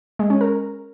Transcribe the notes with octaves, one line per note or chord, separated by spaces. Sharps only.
G#3
C#4
A#4